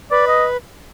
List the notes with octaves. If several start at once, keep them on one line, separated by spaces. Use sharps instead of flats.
B4 D5
D#5